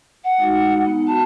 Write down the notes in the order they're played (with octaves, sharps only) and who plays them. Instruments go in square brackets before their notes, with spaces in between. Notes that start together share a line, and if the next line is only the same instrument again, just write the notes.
[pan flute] F#5
[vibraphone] G#3 D#4 F#4
B3 D#4
[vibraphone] F#4 B5 [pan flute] A5